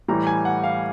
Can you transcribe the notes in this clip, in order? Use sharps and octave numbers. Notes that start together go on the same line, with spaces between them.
A2 E3 G3 A#5
G#5
F#5
F5